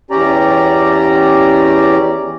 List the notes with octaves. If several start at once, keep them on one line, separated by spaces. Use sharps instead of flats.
E2 C#4 G4 D5 A#5